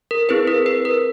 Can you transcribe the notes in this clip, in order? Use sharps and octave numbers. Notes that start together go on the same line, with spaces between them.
A#4
C4 E4 G#4 B4
A#4
B4
A#4